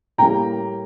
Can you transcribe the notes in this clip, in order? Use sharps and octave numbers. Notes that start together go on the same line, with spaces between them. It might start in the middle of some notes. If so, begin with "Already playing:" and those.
A2 G3 A#3 G5 A#5